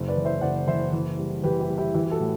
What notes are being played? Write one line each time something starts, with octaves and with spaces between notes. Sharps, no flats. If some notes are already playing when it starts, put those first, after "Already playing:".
Already playing: F#1
B4 D5
E3
C5 E5
F#1 D5 F#5
E3 C5 E5
E3
G3
E3 G4 B4
E4 G4
G3
E4 G4
E3 E4 G4
G4
F#4 A4
A2